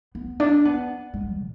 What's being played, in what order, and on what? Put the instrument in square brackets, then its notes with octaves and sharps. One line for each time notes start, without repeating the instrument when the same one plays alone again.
[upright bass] B3
D4
B3
G#3
A#2